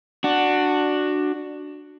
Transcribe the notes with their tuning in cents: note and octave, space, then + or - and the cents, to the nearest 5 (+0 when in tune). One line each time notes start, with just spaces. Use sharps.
D4 +10 F#4 +0